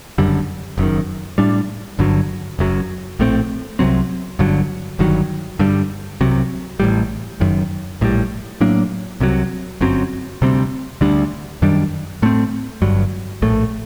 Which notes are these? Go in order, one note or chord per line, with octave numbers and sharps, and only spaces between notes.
F#1 F#2 D3 G3
F#1 F#2 D#3
A2 G3 D4
G1 G2 D3 F#3
F#1 F#2 F#3
A#1 A2 A3 C4
C2 C3 F#3 C4
G1 G2 D3 F#3
G1 G2 D#3 F#3
G2 D3 G3
C2 C3 F#3
A1 A2 G3
F#1 F#2 D#3
A#1 A2 G3
A2 F#3 A#3 D4
C2 C3 F#3
G1 F#2 F#3 C4
D2 C3 G3 C4
D2 D3 G3 D4
F#2 D#3 G3 D4
A2 A3 C4
G1 G2 F#3
A#1 A2 A3